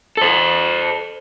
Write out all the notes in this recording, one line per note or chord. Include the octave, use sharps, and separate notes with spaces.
A4 C5